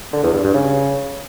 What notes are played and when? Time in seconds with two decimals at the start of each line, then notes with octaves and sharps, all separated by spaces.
0.13 D3
0.23 E2
0.34 G2
0.44 G2
0.54 C#3